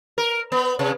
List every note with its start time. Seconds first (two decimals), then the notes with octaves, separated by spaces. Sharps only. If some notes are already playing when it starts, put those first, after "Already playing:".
0.18 A#4
0.52 B3
0.79 C3